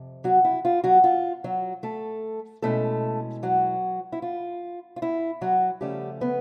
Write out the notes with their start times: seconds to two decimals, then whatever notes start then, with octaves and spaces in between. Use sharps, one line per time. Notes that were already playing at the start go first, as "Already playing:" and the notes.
Already playing: F2 C3
0.24 F#3 F#4
0.44 E4
0.65 F4
0.84 F#3 F#4
1.04 F4
1.44 F#3 F#4
1.83 A3 A4
2.62 B2 G#3 A3 C#4 E4 A4
3.43 F#3 F#4
4.12 E4
4.22 F4
4.96 F4
5.02 E4
5.41 F#3 F#4
5.81 C#3 F3 G3 A3 C#4 G4
6.21 B3 B4